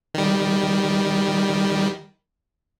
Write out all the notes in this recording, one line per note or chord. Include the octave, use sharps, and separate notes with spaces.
D#3 G3